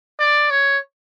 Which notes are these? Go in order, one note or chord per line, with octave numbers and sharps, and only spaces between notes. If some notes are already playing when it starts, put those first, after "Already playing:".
D5
C#5